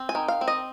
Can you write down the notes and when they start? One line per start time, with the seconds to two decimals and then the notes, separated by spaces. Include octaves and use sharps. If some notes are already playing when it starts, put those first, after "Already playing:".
Already playing: C4
0.09 G#5
0.15 D#3
0.28 F5
0.41 C4
0.48 D#5